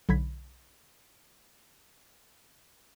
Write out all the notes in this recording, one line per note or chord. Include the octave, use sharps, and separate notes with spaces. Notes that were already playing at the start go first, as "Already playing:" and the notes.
B1 D3 B5 G#6 B6